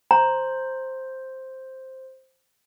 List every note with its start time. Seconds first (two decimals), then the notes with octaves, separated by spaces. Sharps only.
0.11 C5 A#5